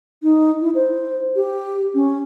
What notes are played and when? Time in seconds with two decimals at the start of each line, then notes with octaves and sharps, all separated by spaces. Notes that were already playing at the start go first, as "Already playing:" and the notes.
0.23 D#4
0.61 E4
0.75 C5
1.36 G4
1.94 C#4